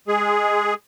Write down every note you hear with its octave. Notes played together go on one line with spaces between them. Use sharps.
G#3 G#4